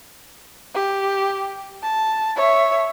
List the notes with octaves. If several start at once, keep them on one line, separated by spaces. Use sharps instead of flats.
G4
A5
C#5 E5